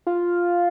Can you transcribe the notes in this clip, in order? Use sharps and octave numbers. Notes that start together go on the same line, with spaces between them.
F4